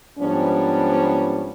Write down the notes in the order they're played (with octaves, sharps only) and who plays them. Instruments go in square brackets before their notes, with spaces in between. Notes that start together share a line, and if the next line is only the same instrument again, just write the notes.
[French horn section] G#2 F3 G3 B3 C#4 D4